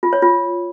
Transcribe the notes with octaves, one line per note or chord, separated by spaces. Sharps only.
F4
C#5
F4